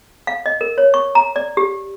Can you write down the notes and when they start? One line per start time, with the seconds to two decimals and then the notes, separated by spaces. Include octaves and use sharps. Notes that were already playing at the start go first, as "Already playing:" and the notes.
0.27 F5
0.46 D#5
0.61 A#4
0.78 C#5
0.94 C#6
1.15 A#5
1.36 D5
1.57 G4